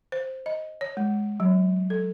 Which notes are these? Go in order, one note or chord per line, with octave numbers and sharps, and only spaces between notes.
C5
D#5
C#5
G#3
F#3
A4